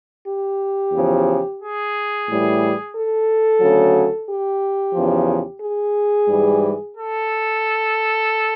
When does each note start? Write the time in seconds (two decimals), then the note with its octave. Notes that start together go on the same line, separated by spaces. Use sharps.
0.25 G4
0.92 E2 C#3 F3
1.59 G#4
2.26 A2 E3 G3
2.93 A4
3.60 D2 C#3 F#3
4.26 G4
4.93 E2 C#3 F3
5.60 G#4
6.27 G#2 E3 G3
6.94 A4